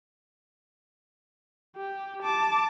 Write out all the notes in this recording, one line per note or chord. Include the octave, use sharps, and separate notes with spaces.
G4
A5 D6